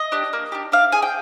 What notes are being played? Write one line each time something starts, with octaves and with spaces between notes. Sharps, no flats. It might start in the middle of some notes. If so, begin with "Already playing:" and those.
Already playing: D#5
D4 G4
A#3
D4 G4
D4 F5
G#4 G#5
G5